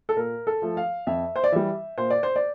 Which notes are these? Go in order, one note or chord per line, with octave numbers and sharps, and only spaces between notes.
A4
A#2 A#4
A4
F3 A3
F5
F2 E5
C5
D5
E3 G3 E5
A#2 C5
D5
C5
D5